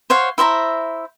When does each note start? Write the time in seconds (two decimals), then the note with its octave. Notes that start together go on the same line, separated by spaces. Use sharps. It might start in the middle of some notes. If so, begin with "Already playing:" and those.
0.10 C5 C#5 F5 F#5
0.38 E4 C5 E5 A#5